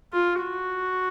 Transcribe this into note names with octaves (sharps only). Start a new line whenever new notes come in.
F4
F#4